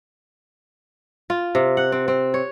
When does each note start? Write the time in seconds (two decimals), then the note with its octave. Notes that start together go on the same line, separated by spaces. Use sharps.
1.30 F4
1.55 C3
1.77 F#5
1.92 C4
2.08 C4
2.34 C#5